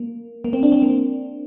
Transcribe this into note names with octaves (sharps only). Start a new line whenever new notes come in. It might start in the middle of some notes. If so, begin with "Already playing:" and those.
Already playing: A#3
A#3
C4
D4
C4
A#3